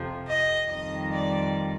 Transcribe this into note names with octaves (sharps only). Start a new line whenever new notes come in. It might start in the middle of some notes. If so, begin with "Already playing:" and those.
Already playing: F2 C3 F3
D#5
F2 D#3 G3 D#5
D5